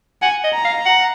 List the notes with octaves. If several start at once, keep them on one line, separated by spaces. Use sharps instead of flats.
F#5 G#5
D#5
A#5
F5
F#5